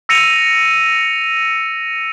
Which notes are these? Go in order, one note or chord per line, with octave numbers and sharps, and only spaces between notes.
E6 A#6 C#7 D#7 F7